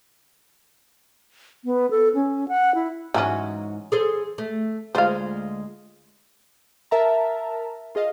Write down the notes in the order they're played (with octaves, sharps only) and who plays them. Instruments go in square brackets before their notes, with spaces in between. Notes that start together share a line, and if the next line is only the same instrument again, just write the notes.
[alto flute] B3
A4
C#4
F#5
E4
[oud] G#2 F#4 [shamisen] E3 F#3 C#4
[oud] G#4 A4 C5
A3
[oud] D2 G#3 F4 [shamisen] C5 F5
[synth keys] A#4 E5 A5 A#5
F4 G#4 D#5 F5